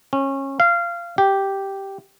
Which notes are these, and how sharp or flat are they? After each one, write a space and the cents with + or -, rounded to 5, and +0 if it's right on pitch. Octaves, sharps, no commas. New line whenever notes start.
C#4 -25
F5 -20
G4 -5